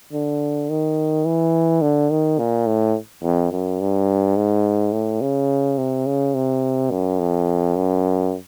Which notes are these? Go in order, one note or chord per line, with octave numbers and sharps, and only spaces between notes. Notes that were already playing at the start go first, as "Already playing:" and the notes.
D3
D#3
E3
D3
D#3
A#2
A2
F2
F#2
G2
G#2
A2
C#3
C3
C#3
C3
F#2
F2
F#2